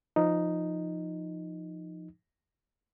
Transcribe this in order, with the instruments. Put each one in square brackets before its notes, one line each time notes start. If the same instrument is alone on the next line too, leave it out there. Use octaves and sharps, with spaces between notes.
[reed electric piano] F3 D#4